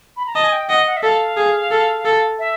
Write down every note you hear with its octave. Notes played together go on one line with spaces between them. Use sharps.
B5
A#5
D#5 A5
G#5
G5
D#5 F#5
F#5
E5
A4 F5
G#4
A4
A4
E5